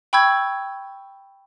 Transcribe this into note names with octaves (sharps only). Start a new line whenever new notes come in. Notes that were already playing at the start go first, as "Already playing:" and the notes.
G5 B5 C#6 E6 G6 G#6